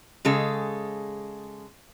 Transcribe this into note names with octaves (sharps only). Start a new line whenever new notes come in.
C#3 G#3 A4